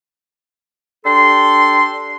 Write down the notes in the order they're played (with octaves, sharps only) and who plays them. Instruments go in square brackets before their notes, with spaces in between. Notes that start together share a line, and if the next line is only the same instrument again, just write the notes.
[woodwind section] D4 G4 A4 C6